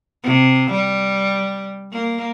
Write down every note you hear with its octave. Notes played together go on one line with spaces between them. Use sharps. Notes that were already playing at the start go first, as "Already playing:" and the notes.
C3
G3
A#3